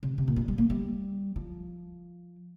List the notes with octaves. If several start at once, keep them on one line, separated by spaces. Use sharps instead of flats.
C3
C3
A#2
G2
G3
A#3
G3
F3